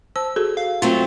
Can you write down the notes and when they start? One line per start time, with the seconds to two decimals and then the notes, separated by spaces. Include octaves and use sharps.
0.16 C5 A5 E6
0.36 F#4 G#4 A4
0.57 F5
0.82 F#3 A3 C4 F4